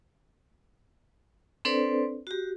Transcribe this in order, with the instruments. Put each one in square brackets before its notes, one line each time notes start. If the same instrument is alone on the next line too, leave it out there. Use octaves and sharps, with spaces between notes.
[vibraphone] C4 D4 A4 B4 C5 D5
F#4 G4